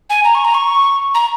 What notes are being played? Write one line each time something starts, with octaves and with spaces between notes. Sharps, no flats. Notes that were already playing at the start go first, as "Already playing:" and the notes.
G#5
A#5
C#6
A#5
C#6
A#5